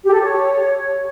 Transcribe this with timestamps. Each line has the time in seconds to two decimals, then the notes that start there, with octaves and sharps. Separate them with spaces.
0.04 G4
0.13 A4
0.22 C#5